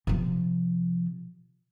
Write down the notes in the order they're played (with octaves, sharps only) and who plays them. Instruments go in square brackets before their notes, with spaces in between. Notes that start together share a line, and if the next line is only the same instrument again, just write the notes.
[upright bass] C3 F3